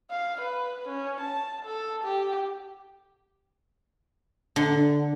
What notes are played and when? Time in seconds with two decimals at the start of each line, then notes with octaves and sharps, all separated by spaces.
0.11 F5
0.41 B4
0.88 C#4
1.21 A5
1.65 A4
2.04 G4
4.56 D3